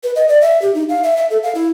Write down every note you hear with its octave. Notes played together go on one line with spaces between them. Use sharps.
B4
D#5
D5
E5
G4
D#4
F5
E5
E5
A4
F5
E4